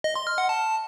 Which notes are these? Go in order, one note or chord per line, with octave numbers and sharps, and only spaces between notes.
D#5
C6
F6
F#5
A5